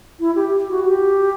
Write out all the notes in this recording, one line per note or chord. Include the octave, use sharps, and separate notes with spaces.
E4
G4
F#4
G4